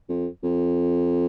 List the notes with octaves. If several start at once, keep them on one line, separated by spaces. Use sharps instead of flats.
F2
F2